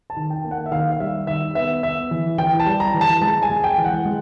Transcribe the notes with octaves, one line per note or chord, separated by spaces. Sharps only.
A5
D#3
G5
A#3
F#5
E5
D#3 F5
F5
G3 E5
D#3 E5
B3 E5
B3 E5
E3
E3 G5
A5
G3
A#5
E3
A5
G#3 A5
G#5
G#3
G5
E3
F#5
G#3